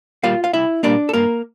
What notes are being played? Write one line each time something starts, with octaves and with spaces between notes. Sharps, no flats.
A#2 G3 A#3 F4 F5
F5
C2 E4 E5
A#2 G3 A#3 D4 D5
A4
G2 A#3 A#4